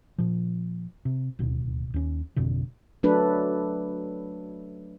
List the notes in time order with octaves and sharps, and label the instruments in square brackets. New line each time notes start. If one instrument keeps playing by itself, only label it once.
[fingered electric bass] A#2 F3
C3
D1 D#2 B2
D#2 C#4
G#1 F2 B2 D3
[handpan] F#3 A3 D4 A4 B4